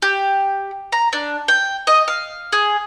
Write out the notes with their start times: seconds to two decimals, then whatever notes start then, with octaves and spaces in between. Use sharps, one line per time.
0.02 G4
0.92 A#5
1.13 D4
1.48 G5
1.87 D#5
2.08 F5
2.53 G#4